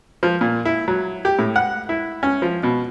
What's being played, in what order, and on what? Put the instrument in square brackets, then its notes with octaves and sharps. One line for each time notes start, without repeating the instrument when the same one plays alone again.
[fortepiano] F3
A#2
E4
F#3
G4
A2
F#5
E4
C#4
F3
B2